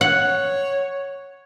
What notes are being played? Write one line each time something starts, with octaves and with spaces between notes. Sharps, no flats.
C#5 F#5